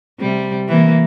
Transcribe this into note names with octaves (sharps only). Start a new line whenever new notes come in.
C3 G3
E3 A#3